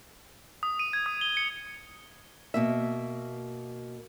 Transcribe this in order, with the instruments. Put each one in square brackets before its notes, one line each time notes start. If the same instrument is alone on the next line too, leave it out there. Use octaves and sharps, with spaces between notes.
[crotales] D#6
D#7
G#6
D#6
G7
C#7
[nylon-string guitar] B2 A#3 E5